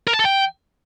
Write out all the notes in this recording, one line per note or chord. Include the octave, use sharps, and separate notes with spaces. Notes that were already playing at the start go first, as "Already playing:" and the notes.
A#4
A5
A4
G5